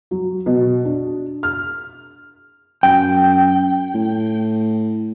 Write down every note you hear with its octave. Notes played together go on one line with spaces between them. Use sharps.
F#3
B2
D4
F6
F#2 G5
A2